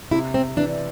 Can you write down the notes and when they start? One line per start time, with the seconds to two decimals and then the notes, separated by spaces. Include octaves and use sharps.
0.11 C3 E4
0.34 C4
0.57 E3 D4